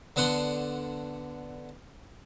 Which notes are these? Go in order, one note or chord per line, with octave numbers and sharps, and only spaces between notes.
D3 B3 D4 F#5 C6